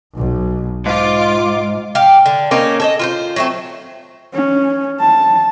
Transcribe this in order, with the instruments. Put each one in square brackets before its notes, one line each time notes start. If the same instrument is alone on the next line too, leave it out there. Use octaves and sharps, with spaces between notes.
[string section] B1
[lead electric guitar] G#2 [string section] F4 D6
[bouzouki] G4 F5
D3
A#3 C#4 D#4 C5
A4 C#5 D#5
F4 F#4 C5
F#3 A3 C4
[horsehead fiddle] C#4
A5